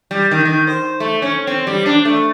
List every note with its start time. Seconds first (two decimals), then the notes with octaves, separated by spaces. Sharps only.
0.11 G3
0.31 D#3
0.45 D#3
0.67 C5
1.00 A3
1.22 C#4
1.47 C4
1.67 G3
1.86 D4
2.05 A3